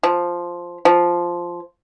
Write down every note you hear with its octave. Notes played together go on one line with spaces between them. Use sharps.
F3
F3